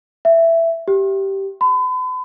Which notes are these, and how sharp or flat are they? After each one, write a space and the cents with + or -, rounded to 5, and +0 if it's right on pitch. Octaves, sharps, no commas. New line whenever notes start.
E5 +10
G4 -10
B5 +40